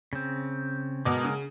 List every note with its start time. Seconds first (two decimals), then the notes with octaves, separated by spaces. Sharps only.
0.13 C#3 C4
1.05 B2 G#3 A#4 D6
1.25 C#3